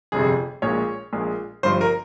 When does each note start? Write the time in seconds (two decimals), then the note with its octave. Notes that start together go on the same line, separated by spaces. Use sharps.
0.12 G1 F2 C3 G#4
0.62 A#1 A#2 G#3 C#5
1.13 A#1 A#2 G#3
1.63 G1 G2 F3 C5
1.81 A#4